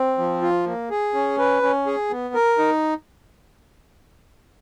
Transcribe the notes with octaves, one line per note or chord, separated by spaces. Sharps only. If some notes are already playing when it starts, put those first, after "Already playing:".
Already playing: C4
F3
F4
A#3
G#4
C#4
B4
C#4
G#4
B3
A#4
D#4